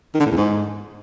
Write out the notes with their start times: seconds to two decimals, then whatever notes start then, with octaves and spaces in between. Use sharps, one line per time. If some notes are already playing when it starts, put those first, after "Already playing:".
0.15 D#3
0.20 D3
0.26 A2
0.31 E2
0.37 G#2